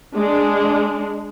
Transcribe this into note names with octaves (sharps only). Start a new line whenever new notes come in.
G#3 D4